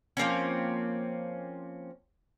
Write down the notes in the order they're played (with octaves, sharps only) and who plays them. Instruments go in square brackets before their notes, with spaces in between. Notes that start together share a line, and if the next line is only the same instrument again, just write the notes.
[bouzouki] F3 A#3 C4 C#4